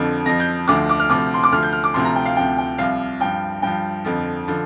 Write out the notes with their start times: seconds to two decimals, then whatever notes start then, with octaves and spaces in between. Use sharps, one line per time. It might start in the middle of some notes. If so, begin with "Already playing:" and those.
Already playing: F2 D3 F3
0.26 F2 F3 A#6
0.40 G6
0.68 D2 D3 F3 D6
0.89 D6
1.00 F6
1.10 D2 C3 F3 D6
1.34 C6
1.44 D6
1.52 D2 D3 F3 F6
1.63 G6
1.73 F6
1.84 D6
1.94 D2 C3 F3 C6
2.05 A#5
2.16 G5
2.26 F5
2.36 D2 C3 F3 G5
2.58 G5
2.78 C2 C3 F3 F5
3.20 G2 F3 G5
3.62 G2 F3 G5
4.05 F2 D3 F3
4.48 D3 F3